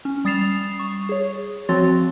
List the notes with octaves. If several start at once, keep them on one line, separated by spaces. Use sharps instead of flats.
C#4
G3 D#6 A6 C7 E7 F7
C#6
G#4 C#5
F3 C4 F#4 C#5 C6 A6